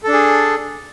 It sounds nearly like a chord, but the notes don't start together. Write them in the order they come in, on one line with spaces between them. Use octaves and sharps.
A4 D4 G#4